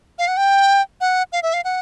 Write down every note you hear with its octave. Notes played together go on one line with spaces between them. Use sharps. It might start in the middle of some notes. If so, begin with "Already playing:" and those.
F5
F#5
G5
F#5
F5
E5
F5
F#5